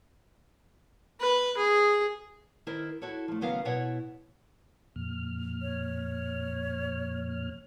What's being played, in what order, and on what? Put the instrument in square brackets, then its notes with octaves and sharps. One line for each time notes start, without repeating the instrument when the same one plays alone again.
[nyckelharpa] B4
G#4
[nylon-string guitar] D#3 E4 A#4 C5
E4 F#4 A4 C#5
F3 A3
D#2 C#3 F#3 B3 A#4 F5
B2 E4 C#5 F#5
[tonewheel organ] F2 A#2 F6
[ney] C#5